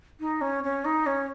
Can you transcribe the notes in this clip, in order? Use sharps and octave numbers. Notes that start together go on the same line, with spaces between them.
D#4
C#4
C#4
D#4
C#4